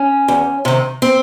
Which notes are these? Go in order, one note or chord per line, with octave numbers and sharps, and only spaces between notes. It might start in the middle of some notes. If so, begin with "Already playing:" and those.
Already playing: C#4
E2
C3 D#3
C4